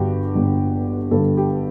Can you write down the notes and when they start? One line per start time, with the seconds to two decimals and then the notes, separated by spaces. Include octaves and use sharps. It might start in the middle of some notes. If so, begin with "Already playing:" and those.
Already playing: G1 G2 D3 F#4 G4
0.35 G1 G2 D3
1.11 G1 G2 D3 A4
1.37 G4